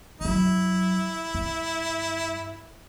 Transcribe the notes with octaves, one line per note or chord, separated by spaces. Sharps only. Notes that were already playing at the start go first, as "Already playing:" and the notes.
F#2 F#3 E4
G2